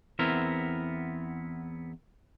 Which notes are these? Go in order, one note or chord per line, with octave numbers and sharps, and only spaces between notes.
E2 B3 C4 E4 A#4